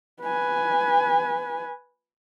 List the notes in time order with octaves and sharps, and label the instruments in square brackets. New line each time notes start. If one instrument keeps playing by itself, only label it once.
[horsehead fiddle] B4 G#5